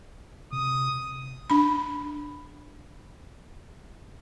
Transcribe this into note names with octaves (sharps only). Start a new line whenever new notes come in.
C3 D#6
D4 B5